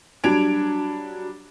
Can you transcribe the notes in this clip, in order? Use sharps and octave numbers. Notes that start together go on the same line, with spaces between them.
F#3 G3 D4 G#6 D7 F7